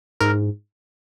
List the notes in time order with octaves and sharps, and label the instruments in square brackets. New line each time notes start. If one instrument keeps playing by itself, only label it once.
[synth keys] G#2 A#4